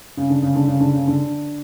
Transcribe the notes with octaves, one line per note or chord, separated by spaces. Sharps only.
C#3
D3
C#3
D3
C#3
D3
C#3
D3